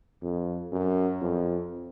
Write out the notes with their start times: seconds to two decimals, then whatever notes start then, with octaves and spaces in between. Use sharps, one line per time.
0.22 F2
0.72 F#2
1.22 F2